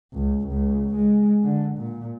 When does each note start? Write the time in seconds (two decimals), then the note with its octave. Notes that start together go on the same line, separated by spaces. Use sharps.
0.14 C#2
0.48 C#2
0.95 G#3
1.43 D3
1.78 A#2